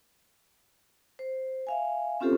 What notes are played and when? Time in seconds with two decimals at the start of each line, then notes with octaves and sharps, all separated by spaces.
1.19 C5
1.67 E5 F5 G#5
2.20 C4 C#4 F4 G4 A4 C5